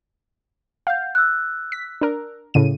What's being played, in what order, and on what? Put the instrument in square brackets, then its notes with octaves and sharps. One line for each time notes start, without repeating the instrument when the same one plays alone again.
[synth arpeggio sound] F5 [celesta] F#5 G6
[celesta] E6 F#6
[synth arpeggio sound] B6
D4 A#4
A2 C#3 D#7